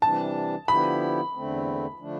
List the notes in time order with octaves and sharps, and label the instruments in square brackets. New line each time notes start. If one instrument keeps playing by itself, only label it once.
[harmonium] C3 E3 G3 D4 [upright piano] A5
[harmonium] D3 F3 B3 E4 G4 [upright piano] B5
[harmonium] E2 D3 A3 C4
D3 F3 A3 D4